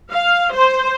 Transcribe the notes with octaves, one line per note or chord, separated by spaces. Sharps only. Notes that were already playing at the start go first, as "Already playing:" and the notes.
F5
C5